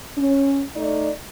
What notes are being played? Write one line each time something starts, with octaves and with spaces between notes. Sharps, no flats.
C#4
A3 D#4 D5